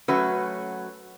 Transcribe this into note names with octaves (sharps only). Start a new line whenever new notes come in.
F#3 A3 C#4 F#4 B4